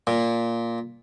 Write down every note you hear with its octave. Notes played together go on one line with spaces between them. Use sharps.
A#2